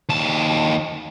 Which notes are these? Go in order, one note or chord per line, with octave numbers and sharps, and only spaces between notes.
D#2 A5